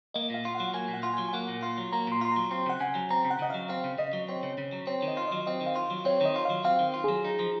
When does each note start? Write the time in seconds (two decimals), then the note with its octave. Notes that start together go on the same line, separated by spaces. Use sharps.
0.14 A#3 D#5
0.30 A#2 F5
0.45 F4
0.55 F#5
0.60 F#3
0.73 A#3 G#5
0.88 A#2
0.94 F#5
1.03 F4
1.13 F#3 G#5
1.28 G#5
1.33 A#3 F#5
1.48 A#2
1.63 F4
1.78 F#3
1.92 A#3 A#5
2.07 A#2 C6
2.21 F4 C6
2.32 F#3 A#5
2.51 C4 C6
2.66 C#3 F#5
2.80 C#3 G#5
2.95 F#3
3.11 C4 A#5
3.25 C#3
3.30 F#5
3.39 C#3 D#5
3.50 F#3 F5
3.69 C4 F5
3.84 C#3
3.98 C#3 D#5
4.13 F#3
4.29 C4 C#5
4.43 C#3
4.58 C#3
4.73 F#3
4.87 C4 C#5
5.02 D#3
5.08 D#5
5.17 F4
5.28 F#3 D#5
5.47 C4 D#5
5.61 D#3
5.66 F5
5.76 F4
5.90 F#3
6.05 C4 C#5
6.21 D#3 D#5
6.36 F4
6.45 F#3 F5
6.65 C4 F5
6.79 D#3
6.94 F4
7.04 F#3 G#4
7.24 D#4
7.39 F3